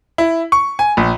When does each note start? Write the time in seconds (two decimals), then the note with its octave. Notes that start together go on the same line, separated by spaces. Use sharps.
0.18 E4
0.52 C#6
0.79 G#5
0.97 A#1